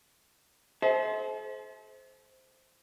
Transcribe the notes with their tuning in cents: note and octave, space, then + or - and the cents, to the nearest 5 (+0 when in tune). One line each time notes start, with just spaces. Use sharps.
A4 -45 C5 +0 E5 -40